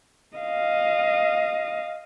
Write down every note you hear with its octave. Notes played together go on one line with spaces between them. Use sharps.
D#5 F5